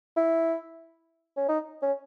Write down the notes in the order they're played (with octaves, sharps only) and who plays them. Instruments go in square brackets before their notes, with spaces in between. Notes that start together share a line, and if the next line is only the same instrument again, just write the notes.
[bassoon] E4
C#4
D#4
C#4